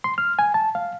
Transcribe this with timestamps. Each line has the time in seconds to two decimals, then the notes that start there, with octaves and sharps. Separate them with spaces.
0.04 C6
0.18 F6
0.39 G#5
0.54 A5
0.75 F5